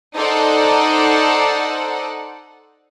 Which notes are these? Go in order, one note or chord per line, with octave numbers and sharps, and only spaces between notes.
D#4 A4 C5 D5 F#5